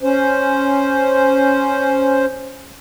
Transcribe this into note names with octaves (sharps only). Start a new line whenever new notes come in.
C#4 C5